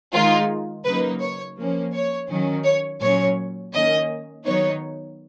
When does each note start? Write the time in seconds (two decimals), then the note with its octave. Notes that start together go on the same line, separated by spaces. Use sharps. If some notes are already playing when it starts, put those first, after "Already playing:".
0.13 D#3 G#3 D#4 F4
0.84 C#3 F#3 A#3 D#4 B4
1.21 C#5
1.57 F3 A#3 C#4
1.94 C#5
2.29 D#3 F#3 C#4
2.65 C#5
3.01 A#2 F#3 C#4 C#5
3.73 D#3 A#3 C#4 D#5
4.45 D#3 F#3 B3 D#4 C#5